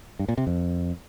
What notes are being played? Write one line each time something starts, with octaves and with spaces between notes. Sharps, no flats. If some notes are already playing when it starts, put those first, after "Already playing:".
G2
A#2
C3
F2